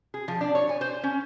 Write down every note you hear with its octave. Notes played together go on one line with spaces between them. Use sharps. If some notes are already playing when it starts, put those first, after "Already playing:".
G#4
F3
D4
C#5
G#5
C5
C#4